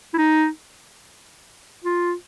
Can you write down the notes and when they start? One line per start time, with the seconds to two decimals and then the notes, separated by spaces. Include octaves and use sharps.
0.14 E4
0.18 D#4
1.85 F4